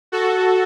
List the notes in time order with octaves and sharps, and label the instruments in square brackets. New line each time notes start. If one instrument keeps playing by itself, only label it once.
[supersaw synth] F#4 A4